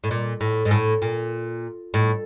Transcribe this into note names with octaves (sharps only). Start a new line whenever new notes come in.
A2
A#2
A2
G#2
A2
A#2
A2